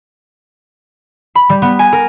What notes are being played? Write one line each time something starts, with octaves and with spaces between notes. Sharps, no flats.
B5
G3
B3
G#5
A#4